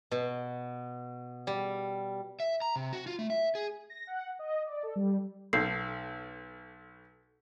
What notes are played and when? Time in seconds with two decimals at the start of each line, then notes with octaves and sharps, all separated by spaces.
0.11 B2
1.47 G3
2.40 E5
2.62 A#5
2.76 C3
2.93 F#4
3.07 F4
3.19 A3
3.30 E5
3.55 G#4
3.90 A#6
4.07 F#5
4.39 D#5
4.66 D5
4.83 A4
4.96 G3
5.53 B1 A4 G6 C7